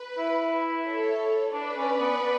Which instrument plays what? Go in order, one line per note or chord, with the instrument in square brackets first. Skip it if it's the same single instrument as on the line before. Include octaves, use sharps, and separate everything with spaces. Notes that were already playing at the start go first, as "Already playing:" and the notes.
Already playing: [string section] B4
[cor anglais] E4
[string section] A4 C#5
[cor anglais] D4 [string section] B4 D5
[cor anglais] C#4
B3
B3